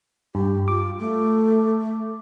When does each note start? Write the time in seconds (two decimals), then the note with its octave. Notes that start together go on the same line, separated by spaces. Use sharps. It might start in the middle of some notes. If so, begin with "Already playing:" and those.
0.35 G2 G4
0.68 F4 D6
0.99 A3